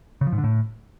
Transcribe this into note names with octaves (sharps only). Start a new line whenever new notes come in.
C#3
F3
G#2
D3
A2